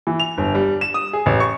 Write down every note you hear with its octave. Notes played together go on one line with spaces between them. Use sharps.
E3
F7
G1
G3
E7
D#6
G#4
A1
C#6